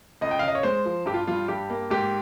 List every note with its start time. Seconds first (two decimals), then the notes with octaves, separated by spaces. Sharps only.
0.21 C#2 D#5
0.31 G5
0.39 C#3 F5
0.48 D#5
0.55 C#5
0.63 G#3 C5
0.86 F3
1.06 G2 G4
1.14 F4
1.27 G3 F4
1.48 G2 G4
1.70 A#3
1.90 G#2 G4